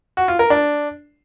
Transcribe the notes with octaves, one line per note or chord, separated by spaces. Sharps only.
F#4
F4
A#4
D4